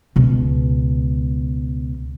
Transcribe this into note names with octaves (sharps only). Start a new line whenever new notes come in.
C#2 B2